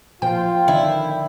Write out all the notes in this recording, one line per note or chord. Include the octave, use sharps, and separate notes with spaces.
A#2 F3 F4 C5 G5
D3 D#3 D4 E4